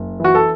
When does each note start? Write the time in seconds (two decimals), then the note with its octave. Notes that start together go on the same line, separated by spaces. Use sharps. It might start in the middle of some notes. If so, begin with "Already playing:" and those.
Already playing: F#1
0.20 E3 F#4
0.35 A4